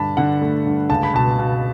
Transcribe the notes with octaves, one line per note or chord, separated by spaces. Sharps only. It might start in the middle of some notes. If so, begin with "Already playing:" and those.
Already playing: G2 D3 D4 A5 B5
D3 F#5
A3
G2
C#2 A5
B5
B2 A5
B2